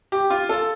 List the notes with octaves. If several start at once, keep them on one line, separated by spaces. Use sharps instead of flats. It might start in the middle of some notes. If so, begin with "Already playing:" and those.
G4
F4
A4